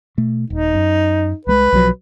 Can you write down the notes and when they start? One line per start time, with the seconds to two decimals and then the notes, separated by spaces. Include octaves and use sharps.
0.18 B2 A3
0.50 D#1 D#4
0.74 F#2
1.47 C2 G3 G#3 B4
1.72 B1 F3 F#3